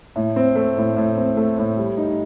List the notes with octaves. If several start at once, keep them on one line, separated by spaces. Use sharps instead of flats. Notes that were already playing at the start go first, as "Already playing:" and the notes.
A2
C4
A3
A2
A2
C4
A3
A2
G3
D#4